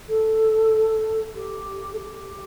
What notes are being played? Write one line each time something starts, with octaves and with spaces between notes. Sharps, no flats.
A4
G4
A4
G4